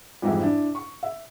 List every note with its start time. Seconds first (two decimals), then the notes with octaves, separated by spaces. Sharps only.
0.22 F2 G#2 E3 G3 E4
0.42 D4 E4
0.75 C#6
1.03 E5